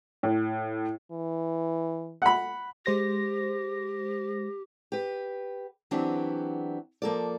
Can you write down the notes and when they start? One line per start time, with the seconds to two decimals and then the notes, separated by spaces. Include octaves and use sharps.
0.23 A2
1.12 E3
2.22 F#5 B5
2.86 G#3 G4 C5 A#6
4.92 G4 B4
5.91 E3 F#3 B3 C4 D4 G4
7.02 F3 A#3 A4 D5